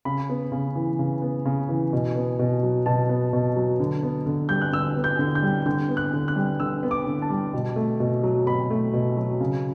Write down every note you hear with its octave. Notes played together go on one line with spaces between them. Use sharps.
C#3 B5
B3
C#3
E3
C#3
B3
C#3
E3
B2
B3
B2
F#3
B2 A5
B3
B2
F#3
D3
B3
D3
G3 G6
F#6
D3 E6
B3
G6
D3
G6
G3
D3 G6
B3
F#6
D3
F#6
G3
D3 E6
B3
D6
D3
A5
G3
B2
A3
B2
F#3
B2 B5
A3
B2
F#3
C#3